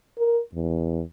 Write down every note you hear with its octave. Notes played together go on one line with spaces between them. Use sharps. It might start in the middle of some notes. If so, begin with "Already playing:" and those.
A#4
E2